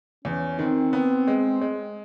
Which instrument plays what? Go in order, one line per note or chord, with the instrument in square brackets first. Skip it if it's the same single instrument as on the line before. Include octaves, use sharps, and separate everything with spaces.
[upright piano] E2 [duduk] C#4
[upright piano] D#3 [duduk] C4
[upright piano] B3
G#3
G#3